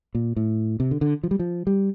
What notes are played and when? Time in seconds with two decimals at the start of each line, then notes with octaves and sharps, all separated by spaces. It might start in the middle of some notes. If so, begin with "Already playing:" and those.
0.15 A#2
0.36 A2
0.80 C3
0.91 D3
1.01 D3
1.23 F3
1.31 G3
1.39 F3
1.67 G3